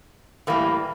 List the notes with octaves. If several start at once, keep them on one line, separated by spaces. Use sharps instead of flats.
A2 E3 G3 A#3